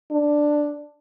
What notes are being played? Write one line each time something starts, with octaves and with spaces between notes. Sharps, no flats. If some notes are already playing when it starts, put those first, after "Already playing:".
D4